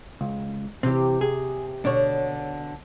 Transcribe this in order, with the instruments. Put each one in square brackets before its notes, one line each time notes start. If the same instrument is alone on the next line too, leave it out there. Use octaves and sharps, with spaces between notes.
[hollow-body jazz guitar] C#2
[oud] C3 G4 [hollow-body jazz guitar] E3 C4
[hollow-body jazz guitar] G#4
[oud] B2 D3 C#5 [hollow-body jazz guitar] D4